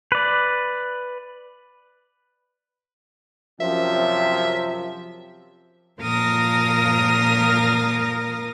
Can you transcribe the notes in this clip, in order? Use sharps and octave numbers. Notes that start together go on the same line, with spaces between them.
B4 D5
F#2 C3 F3 E5
A#2 F3 A#4 F5 D#6 A#6